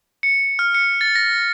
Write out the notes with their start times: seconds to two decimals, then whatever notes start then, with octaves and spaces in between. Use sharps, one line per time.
0.23 C#7
0.59 F6
0.75 C#7
1.01 A6
1.15 A#6